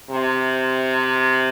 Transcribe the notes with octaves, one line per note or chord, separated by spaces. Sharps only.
C3